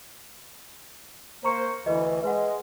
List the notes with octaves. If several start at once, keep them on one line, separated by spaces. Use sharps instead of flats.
A#3 C5 A#5 C#6 C#7
D2 E3 B4 D#5
G#3 B4 F#5